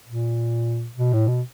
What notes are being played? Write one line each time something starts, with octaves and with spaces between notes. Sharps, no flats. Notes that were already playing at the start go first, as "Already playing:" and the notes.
A#2
B2
A2
B2